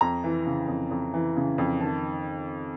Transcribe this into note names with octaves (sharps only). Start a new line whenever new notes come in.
F2 A#5
E3
C#3
F2
F2
E3
C#3
F2
D#3 A5